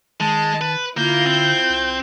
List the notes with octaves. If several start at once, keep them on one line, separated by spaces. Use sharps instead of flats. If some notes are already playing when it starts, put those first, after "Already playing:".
D#3 G#3 A5
B4
D3 A#3 E4 F4 G6
C4
C2